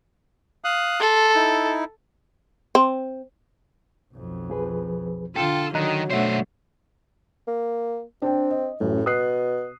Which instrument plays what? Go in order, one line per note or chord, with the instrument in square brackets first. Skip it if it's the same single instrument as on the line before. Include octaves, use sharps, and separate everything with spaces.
[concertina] F5 D#6 F#6
[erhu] A4 [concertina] C6
[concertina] D#4 E4
[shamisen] C4
[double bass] B1 F2
[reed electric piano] F3 G#4 B4
[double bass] D3 [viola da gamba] F4 [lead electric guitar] A4 [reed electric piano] G5
[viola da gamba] D3 [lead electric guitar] D#3 [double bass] F#3 [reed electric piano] D#5 A#5 F#6
[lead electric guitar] F#2 C5 [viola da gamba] B2 A3 D4 [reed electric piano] C#5 E5 F#5
[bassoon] A#3
[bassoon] C4 [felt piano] D4 G5
[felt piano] D#5
[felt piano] A1 F#2 [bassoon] A2
[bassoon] B2 [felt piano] D#6 F#6 C7